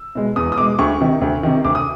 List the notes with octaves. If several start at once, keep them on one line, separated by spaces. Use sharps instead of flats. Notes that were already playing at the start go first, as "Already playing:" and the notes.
Already playing: E6
B2 G#3
E2 D#6
D#6
B2 G#3 D6
D2 C#6
C3 D#3
D2
C3 D#3
D2 D6
D#6